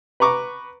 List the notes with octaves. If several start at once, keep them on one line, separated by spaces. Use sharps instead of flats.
B4 A#5 C#6 D6